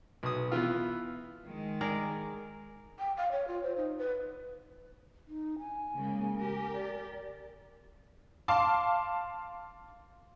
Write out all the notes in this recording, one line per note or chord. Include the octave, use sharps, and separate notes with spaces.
B1 D#6
E3 B3 F4
D#3 G#3
G#4 A#4 D5
G5
F5
C#5
F4
C5
D#4
B4
D#4
G#5
C#3 G#3 A#3
G4 A#4
D5
F5 A5 C6 D6